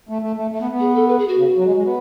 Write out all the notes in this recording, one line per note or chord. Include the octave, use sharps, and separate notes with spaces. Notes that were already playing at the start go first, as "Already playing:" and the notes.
A3
A3
A3
A3
B3
B3
G#4
A4
B4
G#4
F#4
C#3
F#3
G#3
G#3
B3